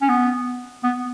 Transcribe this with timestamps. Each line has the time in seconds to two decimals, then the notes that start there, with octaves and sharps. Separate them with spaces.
0.02 C#4
0.09 B3
0.84 B3